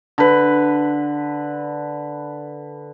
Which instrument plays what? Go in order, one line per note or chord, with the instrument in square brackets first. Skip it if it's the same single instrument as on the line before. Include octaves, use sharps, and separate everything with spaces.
[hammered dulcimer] D3 B4